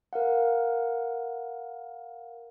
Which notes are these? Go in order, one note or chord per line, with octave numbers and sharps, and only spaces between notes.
A#4 F5 F#5